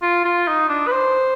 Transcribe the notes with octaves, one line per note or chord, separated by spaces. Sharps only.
F4
F4
D#4
D4
B4
C5